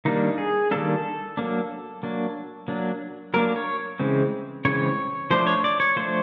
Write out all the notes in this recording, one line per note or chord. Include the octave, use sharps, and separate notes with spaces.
D#3 G3 A#3 D4 D#4
G#4
D#3 G3 A#3 D4 A4
F#3 A#3 D4
F#3 A#3 D4
F#3 A#3 D4
F#3 A#3 D4 A#4
C#5
C#3 E3 G#3 C4
C#3 E3 G#3 C4 C#5
F3 A3 D4 C5
C#5
D5
C#5
F3 A3 D4 C5